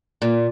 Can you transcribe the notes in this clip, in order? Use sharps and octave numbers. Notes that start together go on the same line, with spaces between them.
A#2